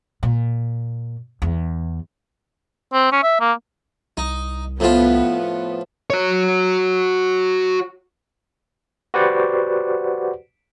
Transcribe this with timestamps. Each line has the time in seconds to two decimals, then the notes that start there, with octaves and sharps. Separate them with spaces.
0.23 A#2
1.42 E2
2.93 C4
3.12 C#4
3.23 E5
3.40 A#3
4.17 C2 D#4
4.80 A2 F3 B3 F4
6.10 F#4 C#5
9.14 F#4 G4 B4 C5 D5 F#5